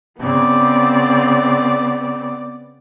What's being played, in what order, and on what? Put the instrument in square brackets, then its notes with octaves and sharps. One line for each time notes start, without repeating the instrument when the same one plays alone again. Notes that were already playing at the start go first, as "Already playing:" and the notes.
[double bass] C#3 C4 [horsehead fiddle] B3 D5